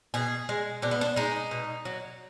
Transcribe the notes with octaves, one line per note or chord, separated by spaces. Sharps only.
B2 G#4
G#3
B2 D4
B3
D4
G#3 D#4
B2
F#3